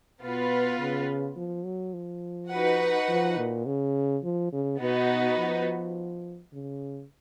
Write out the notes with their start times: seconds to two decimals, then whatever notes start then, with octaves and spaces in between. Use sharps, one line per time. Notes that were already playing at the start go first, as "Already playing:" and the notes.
0.22 B2 B3 F4 B4
0.79 C#3
1.37 F3
1.65 F#3
1.94 F3
2.51 D#4 F#4 B4 F#5
3.09 F3
3.37 A#2
3.66 C#3
4.24 F3
4.52 C#3
4.81 B2 B3 D#4 F#4 B4
5.38 F3
6.53 C#3